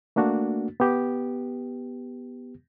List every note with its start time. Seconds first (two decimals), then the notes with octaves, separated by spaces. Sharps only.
0.16 A3 A#3 D4 F#4
0.80 B3 G4